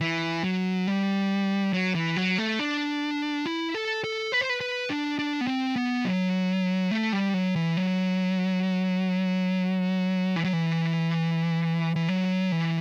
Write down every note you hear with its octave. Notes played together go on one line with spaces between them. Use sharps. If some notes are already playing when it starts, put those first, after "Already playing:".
E3
F#3
G3
F#3
E3
F#3
A3
D4
E4
A4
A4
B4
C5
B4
B4
D4
D4
B3
C4
B3
F#3
A3
G3
F#3
E3
F#3
E3
F#3
E3
E3
F#3
E3